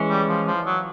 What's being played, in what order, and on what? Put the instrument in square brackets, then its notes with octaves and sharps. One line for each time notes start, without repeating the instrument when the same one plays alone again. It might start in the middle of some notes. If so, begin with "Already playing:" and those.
Already playing: [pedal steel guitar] E3 G#3 C#4
[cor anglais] G3
F3
F3
F#3